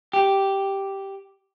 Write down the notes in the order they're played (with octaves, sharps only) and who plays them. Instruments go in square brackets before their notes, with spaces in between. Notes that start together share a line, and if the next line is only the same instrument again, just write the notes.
[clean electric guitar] G4